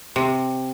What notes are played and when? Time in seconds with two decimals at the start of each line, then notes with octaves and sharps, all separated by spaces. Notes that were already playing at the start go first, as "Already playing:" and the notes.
0.16 C3